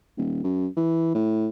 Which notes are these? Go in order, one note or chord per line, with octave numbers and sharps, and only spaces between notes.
D#1
F#2
E3
A2